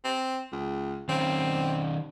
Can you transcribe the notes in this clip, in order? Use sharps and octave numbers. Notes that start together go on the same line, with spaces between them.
C4
C#2
D#3 C4 C#4